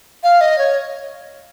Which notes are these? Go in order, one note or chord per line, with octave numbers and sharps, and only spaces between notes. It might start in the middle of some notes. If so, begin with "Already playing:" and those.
F5
D#5
C#5